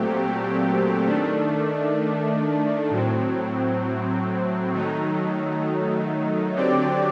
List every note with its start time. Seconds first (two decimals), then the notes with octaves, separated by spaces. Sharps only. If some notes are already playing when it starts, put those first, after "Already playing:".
Already playing: A#2 F#3 A3 C4 G4
1.06 D#3 A3 D4
2.90 A2 F#3 C4
4.72 D#3 F#3 A3 D#4
6.56 D3 F#3 C4 G4 D5